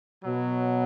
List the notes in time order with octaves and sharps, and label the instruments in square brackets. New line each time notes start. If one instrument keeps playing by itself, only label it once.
[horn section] B2 F#3